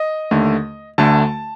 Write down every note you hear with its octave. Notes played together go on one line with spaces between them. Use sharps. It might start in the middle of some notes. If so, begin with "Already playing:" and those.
Already playing: D#5
D#2 D3 A3
D2 D3 A3 A5